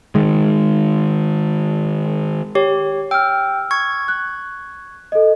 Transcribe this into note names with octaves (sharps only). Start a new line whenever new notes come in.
D#3 G#3
G4 C#5
G5 E6 F6
C#6 G#6
F#6
A4 D#5